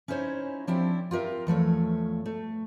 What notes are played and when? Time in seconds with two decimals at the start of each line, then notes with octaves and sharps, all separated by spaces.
0.08 C#4 D#4 E4 C5 C#5
0.67 F3 C4 D4 E4 G4
1.11 F4 G4 A#4 E5
1.47 E2 F3 A3 C#5
2.26 A3